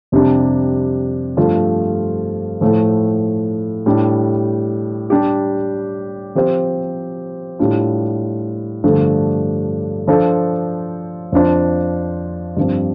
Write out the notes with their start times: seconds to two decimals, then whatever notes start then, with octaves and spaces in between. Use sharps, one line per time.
0.12 F2 C3 G3 D4
1.37 G2 F3 A3 F4 C5
2.61 A2 F3 A3
3.86 A2 G3 D4 G4
5.10 G3 D4 G4
6.35 F3 C4 G4 C5
7.59 A2 G3 D4 F4
8.84 G2 D3 F3 A3 D4
10.08 F3 D4 A4 C5
11.32 F2 F3 D4 F4 C5
12.57 G2 F3 C4